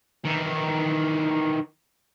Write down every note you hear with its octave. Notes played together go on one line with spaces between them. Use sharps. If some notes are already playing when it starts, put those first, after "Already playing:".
D#3 E3